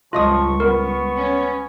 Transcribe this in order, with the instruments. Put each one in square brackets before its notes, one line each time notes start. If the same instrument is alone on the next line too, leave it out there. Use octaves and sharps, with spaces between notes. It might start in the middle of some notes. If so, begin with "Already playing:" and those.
[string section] C#2 G2 [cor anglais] F3 [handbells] F4 D#5 D#6 [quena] C#6
[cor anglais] B3 [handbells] A#4
[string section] C#4